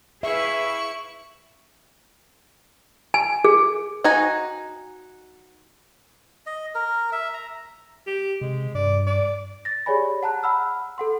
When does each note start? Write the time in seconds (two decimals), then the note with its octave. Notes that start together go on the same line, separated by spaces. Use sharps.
0.23 E4 G#4 B4 E5 F5 C#6
3.14 G#5
3.45 G#4
4.04 D#4 F#4 G#5
6.46 D#5
6.75 A#4
7.12 E5
7.34 A#5
8.07 G4
8.41 C3 G#3
8.75 G2 D5
9.07 D5
9.65 A6 A#6
9.86 G4 G#4 C#5 D5 G#5 B5
10.23 F#5 A5 A#5 F#6
10.43 F#5 B5 E6 F6
10.98 A4 F#5 C6